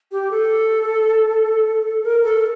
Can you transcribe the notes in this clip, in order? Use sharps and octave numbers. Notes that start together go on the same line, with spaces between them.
G4
A4
A#4
A4